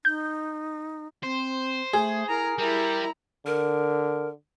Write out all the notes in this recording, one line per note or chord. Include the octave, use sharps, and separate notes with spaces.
D#4 G6
C4 C5
A3 G#4
E4 A#4 A#5
G3 E4 A#4 A#5
D3 A#4